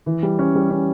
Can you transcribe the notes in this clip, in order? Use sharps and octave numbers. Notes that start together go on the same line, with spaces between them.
E3
G3
C#4
G3
C#4